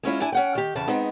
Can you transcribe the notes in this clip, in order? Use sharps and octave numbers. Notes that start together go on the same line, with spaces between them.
G#3 C#4 E4 F4
D4 E4 G#5
C#4 F#5 G5
D#3 G4
E2 C#3 A5
G#3 B3 C4 D#4